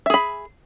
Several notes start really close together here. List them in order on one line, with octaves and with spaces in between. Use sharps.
E5 G#4 B5